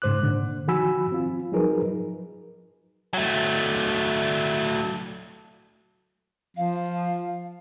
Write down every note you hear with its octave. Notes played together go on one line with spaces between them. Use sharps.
G#2 C#3 C5 D6 F#6
A#2 D3
D#3 F3 F#4 G#5 B5 E6
C4 F4
F3 F#3 D#4 G#4 A#4 B4
F#3 A3
F3 F5